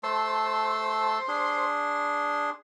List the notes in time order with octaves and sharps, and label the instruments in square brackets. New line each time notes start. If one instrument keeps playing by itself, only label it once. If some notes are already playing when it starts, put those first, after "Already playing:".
[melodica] A3 A5 E6 [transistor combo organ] C5
[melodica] D4 G#4 C6